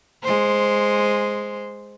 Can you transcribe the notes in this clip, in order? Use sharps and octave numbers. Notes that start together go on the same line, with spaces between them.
G#3 C5